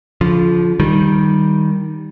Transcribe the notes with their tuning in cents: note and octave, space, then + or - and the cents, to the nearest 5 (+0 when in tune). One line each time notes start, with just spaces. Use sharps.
D3 -45 F3 +0
D#3 +0 G3 +0